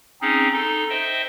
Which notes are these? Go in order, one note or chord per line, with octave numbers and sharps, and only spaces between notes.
C4 C#4 D#4 G#4
D#4 A4 C6
C5 D#5 E5 G5